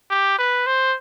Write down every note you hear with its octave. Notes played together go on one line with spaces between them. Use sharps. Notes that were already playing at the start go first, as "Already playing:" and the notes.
G4
B4
C5